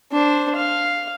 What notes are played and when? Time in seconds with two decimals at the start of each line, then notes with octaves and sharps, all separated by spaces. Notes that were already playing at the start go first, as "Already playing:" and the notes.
0.12 D4 C5
0.56 F5